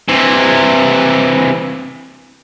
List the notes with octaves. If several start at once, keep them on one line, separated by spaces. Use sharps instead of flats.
C3 E3